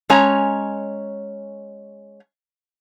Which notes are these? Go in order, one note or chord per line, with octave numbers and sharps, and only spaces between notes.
G#3 C#4 C#5 G#5 A#5